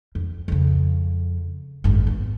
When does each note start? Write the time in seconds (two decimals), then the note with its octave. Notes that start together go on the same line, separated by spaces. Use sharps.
0.15 F2
0.48 F2 C#3
1.84 G#1 F#2
2.07 B3